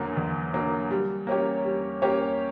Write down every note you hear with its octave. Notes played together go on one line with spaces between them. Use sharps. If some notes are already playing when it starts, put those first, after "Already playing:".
Already playing: E2 D3 F#3 A#3
E2
D3 F#3 A#3
G3
A#3 C#4 G4 C#5
G3
A#3 C#4 G4 C#5